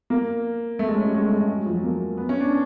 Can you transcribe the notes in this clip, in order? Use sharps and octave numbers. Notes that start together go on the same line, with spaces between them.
A#3
A3
G#3
C#4
G3
G#3
A3
A3
G#3
F#3
F3
F#3
A#3
B3
C#4
D4